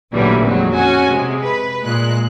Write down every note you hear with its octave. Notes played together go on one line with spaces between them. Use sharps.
A1 A#2 D3 E3 F#3 G3
F2 D#3 F#3 G#3 C4
C#4 F#4 G#5
C3 G#3
B4
A#2 G#3 F#6